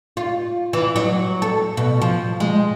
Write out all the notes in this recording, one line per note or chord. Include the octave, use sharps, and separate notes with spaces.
F4
E3
F#3
A4
B2
F3
G#3